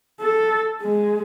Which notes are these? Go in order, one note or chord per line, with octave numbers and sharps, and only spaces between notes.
A4
G#3